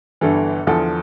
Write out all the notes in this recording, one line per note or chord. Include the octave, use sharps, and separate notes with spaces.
G1 G2 E3 A4
E2 D3 F3 A4